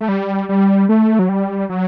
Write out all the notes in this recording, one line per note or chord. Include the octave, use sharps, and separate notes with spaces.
A3
G3
G3
A3
F#3
G3
F#3